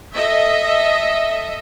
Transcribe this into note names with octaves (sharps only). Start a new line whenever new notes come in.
A4 D#5 E5